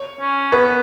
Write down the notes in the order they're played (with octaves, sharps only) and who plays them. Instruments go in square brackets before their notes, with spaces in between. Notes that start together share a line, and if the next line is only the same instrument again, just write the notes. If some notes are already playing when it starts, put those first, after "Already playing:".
Already playing: [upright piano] C#5
[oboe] C#4
[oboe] B3 [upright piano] B4